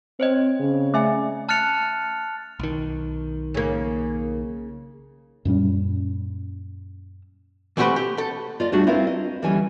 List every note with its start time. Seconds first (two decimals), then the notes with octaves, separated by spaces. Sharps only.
0.20 C4 C5 C#5 D#5
0.60 C#3
0.94 A3 E5 G#5
1.49 A5 F6 F#6 A6 C#7 F7
2.59 B1 D#3
3.54 C#3 A#3
5.45 F#2 A#2 G3 C#4
7.77 E3 A3 C4 F#4 G4 B4
7.96 G4
8.18 A4
8.60 F4 D5 D#5
8.72 G3 A3 D4 F#4
8.87 C4 E4 F4 A#4 B4 F5
9.07 D#5
9.42 D2 E3 G3 C#4 D#5 G#5